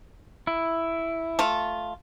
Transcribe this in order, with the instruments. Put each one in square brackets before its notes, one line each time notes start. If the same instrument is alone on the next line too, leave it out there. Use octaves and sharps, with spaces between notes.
[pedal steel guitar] E4
[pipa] A3 F4